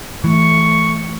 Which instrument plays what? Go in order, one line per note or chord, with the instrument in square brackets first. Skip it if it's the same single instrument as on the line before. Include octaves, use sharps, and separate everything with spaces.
[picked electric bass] E3 [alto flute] A3 [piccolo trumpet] C#6